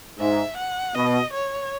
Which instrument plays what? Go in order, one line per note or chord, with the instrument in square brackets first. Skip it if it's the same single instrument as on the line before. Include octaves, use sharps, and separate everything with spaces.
[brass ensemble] G#2 [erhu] E5
[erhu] F#5
[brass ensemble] B2 [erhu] D#5
[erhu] C#5